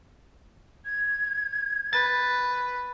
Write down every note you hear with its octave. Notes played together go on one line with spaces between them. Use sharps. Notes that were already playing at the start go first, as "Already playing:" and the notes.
G#6
B4 A6